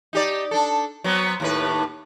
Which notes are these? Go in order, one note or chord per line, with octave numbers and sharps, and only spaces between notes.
D#4 G4 D5
D4 A4
F#3 B3 C4
D#2 A2 B4